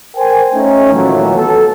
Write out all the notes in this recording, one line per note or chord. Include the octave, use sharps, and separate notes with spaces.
A#4 C5 G5 G#5
A3 C#4 D#4
A#2 D#3 E3 F#3 A3 A#3
B3 A4 A5